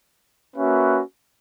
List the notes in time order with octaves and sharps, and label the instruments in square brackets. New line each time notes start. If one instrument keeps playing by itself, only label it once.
[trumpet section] A#3 C#4 F#4 B4 E5